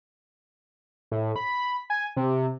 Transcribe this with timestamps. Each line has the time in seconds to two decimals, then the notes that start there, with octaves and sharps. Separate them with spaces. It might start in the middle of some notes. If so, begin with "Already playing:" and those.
1.11 A2
1.36 B5
1.90 G#5
2.17 C3